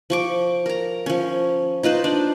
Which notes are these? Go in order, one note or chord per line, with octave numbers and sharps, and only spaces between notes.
F3 C#6 D6
A#4 A#5
F3 C#4
D#4 F4 B4 C5
D4